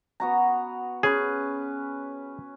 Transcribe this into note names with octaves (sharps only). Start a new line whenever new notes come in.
B3 F#4 A#5
C#4 G#4 B4